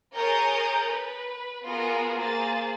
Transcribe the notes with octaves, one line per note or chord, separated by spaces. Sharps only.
G#4 A#4 C#5 D#6 G6 A6
B4
B3 F4 F#4 G#4 A#4
A#3 G#4 C5 A6